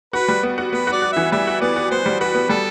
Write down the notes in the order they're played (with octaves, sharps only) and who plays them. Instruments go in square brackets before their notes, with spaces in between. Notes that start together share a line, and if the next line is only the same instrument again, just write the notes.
[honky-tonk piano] F#4 [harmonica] B4
[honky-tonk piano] G3
B3
F#4
[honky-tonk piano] B3 [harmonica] B4
[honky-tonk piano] F#4 [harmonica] D5
[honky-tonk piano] F#4
[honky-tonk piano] E3 [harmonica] E5
[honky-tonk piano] G3 [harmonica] E5
[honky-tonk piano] F#4
[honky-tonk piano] B3 [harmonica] D5
[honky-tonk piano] F#4
[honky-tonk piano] B3 [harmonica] C5
[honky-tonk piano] G3
[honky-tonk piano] F#4 [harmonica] B4
[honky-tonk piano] B3
[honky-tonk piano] G3 [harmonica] A4